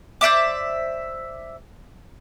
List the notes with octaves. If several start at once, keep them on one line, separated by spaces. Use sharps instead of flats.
C5 D5 E5 D6